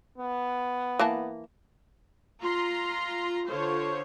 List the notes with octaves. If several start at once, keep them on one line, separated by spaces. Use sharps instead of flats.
B3
E3 A#3 A5
F4 A#5 C6
D3 F4 C5 C#5